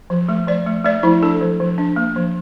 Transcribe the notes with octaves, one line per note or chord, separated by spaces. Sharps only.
F3
A3
F3 D5
A3
A3 D5
F3 E4
D4 A4
F3
F3
D4
A#3
F3